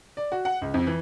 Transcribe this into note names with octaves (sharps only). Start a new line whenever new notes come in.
D5
F#4
F#5
C#2
F2
E3